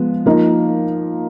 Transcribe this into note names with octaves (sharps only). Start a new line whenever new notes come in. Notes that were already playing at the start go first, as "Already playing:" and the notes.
Already playing: F3 G#3 B3
F3 A#3 D#4